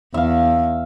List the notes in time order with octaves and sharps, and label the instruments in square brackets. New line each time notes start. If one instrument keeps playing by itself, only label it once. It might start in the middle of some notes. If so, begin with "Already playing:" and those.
[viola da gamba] E2 [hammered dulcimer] E5 F5